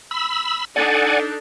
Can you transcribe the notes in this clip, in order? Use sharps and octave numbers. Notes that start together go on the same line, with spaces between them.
B5 E6
D4 D#4 A4 D5 F#5 G#5